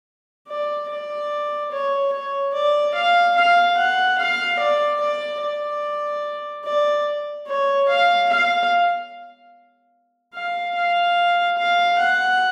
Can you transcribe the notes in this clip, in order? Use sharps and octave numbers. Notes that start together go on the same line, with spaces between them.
D5
D5
C#5
C#5
D5
F5
F5
F#5
F5
D5
D5
D5
D5
C#5
F5
F5
F5
F5
F5
F#5